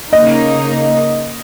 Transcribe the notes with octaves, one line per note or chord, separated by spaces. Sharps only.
C#3 A#3 D#4 D#5